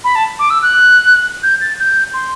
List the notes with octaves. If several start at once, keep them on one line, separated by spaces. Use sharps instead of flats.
B5
A5
D6
E6
F#6
G6
A6
G6
C6